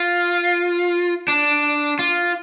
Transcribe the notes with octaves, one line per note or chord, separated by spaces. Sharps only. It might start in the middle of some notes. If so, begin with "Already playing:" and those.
Already playing: F4
D4
F4